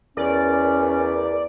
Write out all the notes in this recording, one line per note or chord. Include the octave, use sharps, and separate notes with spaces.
E2 C#4 A#4 D5